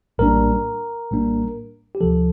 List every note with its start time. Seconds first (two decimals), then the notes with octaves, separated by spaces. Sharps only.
0.18 A#1 A2 G3 A#3 D4 A#4
1.10 A#1 A2 G3 A#3 D4
1.95 G4
2.00 D2 C3 F3 A4